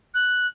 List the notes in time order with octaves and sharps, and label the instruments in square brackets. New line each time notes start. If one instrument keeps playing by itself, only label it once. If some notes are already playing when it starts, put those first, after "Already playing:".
[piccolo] F#6